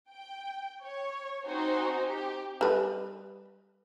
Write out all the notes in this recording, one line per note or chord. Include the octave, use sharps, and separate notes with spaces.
G5
C#5
C4 D#4 F#4 C5 G#5
G4
G3 B4